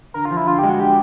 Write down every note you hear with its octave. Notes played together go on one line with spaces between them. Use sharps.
D3 A#4
F4
F3
E4
D3 F4
G#3 G4
F#4
D3 G4